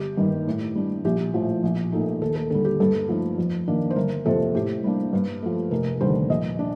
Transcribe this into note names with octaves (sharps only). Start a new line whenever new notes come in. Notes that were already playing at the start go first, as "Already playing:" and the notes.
Already playing: G1 G4
G2 D#3
A2
G3 D4
A#1 G4
A2 F3
A#1
A#2 A3 D#4
D#2 A4
A4
D3 G3 A4
G4
G2 A4
F3 A3 D#4
F2
D#3 A#3 D4
C5
G1 A#4
F2 C3 F3 C4 A4
A2 G4
G3 A#3 D4
G2
F3 A3
F1 A#4
D#2 D3 G3 C5
A#1 D#5
D4